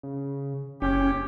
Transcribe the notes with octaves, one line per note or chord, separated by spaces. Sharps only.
C#3
F#1 C#4 G4